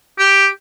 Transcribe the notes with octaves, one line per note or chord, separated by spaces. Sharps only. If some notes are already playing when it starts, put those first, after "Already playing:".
G4